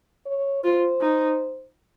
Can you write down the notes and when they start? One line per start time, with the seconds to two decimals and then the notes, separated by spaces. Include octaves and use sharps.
0.26 C#5
0.64 F4 C5
1.02 D#4